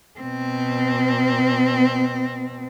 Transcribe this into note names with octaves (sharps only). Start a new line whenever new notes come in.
B2 C4